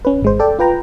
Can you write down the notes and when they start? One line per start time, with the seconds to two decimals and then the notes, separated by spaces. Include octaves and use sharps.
0.05 C#4 B4
0.22 G#1 G#3 C5
0.40 A4 D5 G5
0.59 F4 B4 G5 A#5